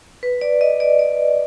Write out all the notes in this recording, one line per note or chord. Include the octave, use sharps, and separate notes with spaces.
B4
D5
D#5
D5
D5